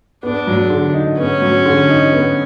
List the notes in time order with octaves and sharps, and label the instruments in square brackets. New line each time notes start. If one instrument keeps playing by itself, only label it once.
[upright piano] B3 [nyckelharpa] D4
[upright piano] F#3
D3
D#4
[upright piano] B3 [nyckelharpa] C#4
[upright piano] F#3
D3
D#4
B3